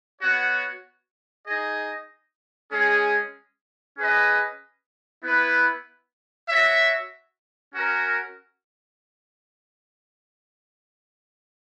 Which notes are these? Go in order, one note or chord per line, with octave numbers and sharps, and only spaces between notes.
B3 F#4 C#5 F#5
D#4 G#4 D#5
G#3 C#4 G#4
C#4 G#4 B4 D#5
B3 E4 B4
F#4 C#5 E5
C#4 F#4 A#4